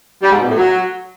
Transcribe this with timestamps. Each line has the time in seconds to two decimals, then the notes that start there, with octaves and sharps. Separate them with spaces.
0.23 G3
0.31 G#2
0.40 B2
0.48 A2
0.56 F#3